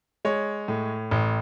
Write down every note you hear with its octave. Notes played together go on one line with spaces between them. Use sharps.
G#3 C#5
A2
A1